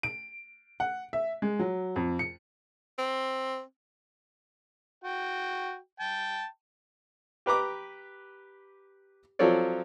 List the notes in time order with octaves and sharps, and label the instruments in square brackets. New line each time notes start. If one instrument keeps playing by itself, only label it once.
[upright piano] D7
F#5
E5
G#3
F#3
F2
C#7
[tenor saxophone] C4
[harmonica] F#4 G5
G5 A5
[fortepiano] G4 B4 A#5 D6
F3 F#3 C4 A4 C#5 D5